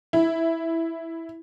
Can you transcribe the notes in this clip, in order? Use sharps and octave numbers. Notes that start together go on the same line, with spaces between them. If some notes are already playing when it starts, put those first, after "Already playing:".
E4